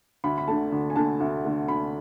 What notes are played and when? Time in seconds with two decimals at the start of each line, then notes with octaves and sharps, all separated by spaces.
0.24 D2 B5
0.38 B5
0.48 D3 A3 A5
0.72 D2
0.90 G#5
0.96 D3 A3 A5
1.20 D2
1.45 D3 A3
1.68 D2 B5